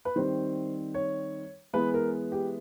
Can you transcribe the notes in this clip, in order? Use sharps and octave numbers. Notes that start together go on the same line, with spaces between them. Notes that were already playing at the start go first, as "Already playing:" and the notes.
B4
D#3 G3 C4 C5
C#5
E3 G#3 B3 B4
A#4
G4